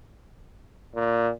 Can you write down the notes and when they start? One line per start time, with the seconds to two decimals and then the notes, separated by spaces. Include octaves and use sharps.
0.95 A#2